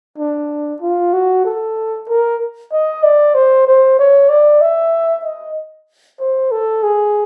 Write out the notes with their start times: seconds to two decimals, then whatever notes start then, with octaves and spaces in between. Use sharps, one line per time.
0.18 D4
0.82 F4
1.13 F#4
1.45 A4
2.09 A#4
2.72 D#5
3.03 D5
3.35 C5
3.67 C5
3.99 C#5
4.29 D5
4.61 E5
5.24 D#5
6.20 C5
6.51 A4
6.83 G#4